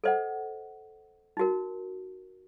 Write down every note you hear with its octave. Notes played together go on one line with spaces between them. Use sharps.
A4 C5 D#5 F#5
D#4 F#4 A#4